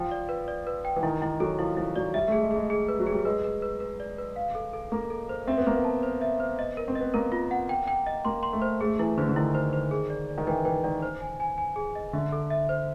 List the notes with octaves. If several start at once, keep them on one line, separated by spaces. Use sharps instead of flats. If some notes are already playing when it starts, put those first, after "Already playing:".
Already playing: F3 G5
D5
B4
D5
B4
G5
E3
D#3 E4
D#3 E4
F#3 A4
F3 E4
F3 E4
F#3 D5
G3 E5
A3 G#4
G#3
G#4
G#3
G#4
B4
F#3
G#4
G3
G#3 B4
B4
B4
B4
D5
B4
F5
A4
A4
A#3 A4
A4
C5
C4 E5
B3
A#3 C5
B3
A5
C5
E5
C5
D#5
A#4
C4
B3 D#5
A#3 A#4
F4
F#5
G5
G5
D#5
A#3 C6
C6
A3
C5
A3 G#4
E3 E4
D3 C5
D3
D#3 E4
C5
C5
G#4
D5
D5
D#3
E3 G5
E3 G5
D#3 D5
C5
G#5
G#5
G#5
G#4
D#5
D3 E5
A4
E5
C5